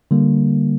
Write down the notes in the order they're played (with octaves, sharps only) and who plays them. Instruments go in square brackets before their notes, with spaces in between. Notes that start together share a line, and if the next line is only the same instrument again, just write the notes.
[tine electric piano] D3 G3 A#3